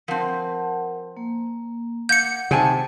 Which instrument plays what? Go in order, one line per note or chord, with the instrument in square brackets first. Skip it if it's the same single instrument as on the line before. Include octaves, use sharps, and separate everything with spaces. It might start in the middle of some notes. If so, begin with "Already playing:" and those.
[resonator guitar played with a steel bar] F3 C4 [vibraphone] A#4 F#5 A5
[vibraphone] A#3
[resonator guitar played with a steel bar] A#3 [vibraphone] F#5 [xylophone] G6 C#7
[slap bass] C3 [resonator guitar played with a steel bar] D#3 G#5 A5